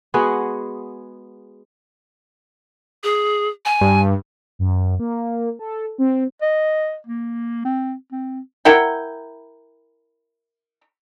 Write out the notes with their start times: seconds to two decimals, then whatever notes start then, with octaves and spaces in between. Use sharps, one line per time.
0.14 G#3 B3 F#4 G#4
3.04 G#4
3.66 G#5
3.81 G2
4.59 F#2
4.99 A#3
5.59 A4
5.98 C4
6.42 D#5
7.07 A#3
7.65 C4
8.12 C4
8.65 E4 A#4 F#5 G5